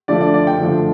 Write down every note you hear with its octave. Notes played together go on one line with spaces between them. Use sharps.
D3 F3 A3 D4 D5
D5
D5
G5
D3 F3 A3 D4